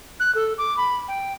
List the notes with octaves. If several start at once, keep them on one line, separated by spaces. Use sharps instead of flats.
F#6
A4
D6
B5
G5